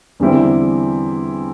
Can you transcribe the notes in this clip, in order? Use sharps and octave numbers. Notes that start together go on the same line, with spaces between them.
E2 D3 G3 C4 E4